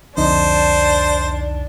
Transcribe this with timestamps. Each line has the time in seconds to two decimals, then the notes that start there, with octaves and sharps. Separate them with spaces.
0.17 C2 F2 D3 D4 D#4 C5